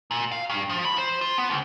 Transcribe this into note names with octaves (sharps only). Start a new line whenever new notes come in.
A#2
F5
G2
F3
B5
C5
F4
B3
C#2